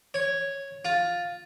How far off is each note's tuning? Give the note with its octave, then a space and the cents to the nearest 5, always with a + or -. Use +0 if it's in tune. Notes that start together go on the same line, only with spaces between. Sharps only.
C#5 -5
F4 +10